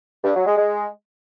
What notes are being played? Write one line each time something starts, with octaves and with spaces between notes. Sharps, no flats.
G2
F#3
G#3
G#3